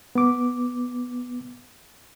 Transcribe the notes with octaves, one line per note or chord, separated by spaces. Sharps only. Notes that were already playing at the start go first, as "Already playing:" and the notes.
B3 D6